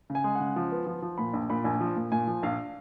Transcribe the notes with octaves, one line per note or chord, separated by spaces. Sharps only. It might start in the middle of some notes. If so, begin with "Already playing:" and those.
C#3
G#5
G#3
C#3 F#5
F3
B3
F3
F3
A#2 B5
A#1
A#2 B5
A#1 G#5
F3
A#2
A#2 G#5
F3
A#1 F5